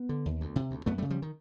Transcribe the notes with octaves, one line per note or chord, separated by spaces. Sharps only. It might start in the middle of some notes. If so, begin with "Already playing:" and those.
Already playing: B3
D3
D#2
D2
C3
D2
F#2 A3 B3
G3 A3
C#3
F3 G3
D#3